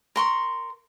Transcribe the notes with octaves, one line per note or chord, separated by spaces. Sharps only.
A#4 C6 C#6